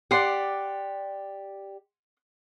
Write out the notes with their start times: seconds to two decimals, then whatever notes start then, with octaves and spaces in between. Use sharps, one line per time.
0.11 G4 D5 F#5 C6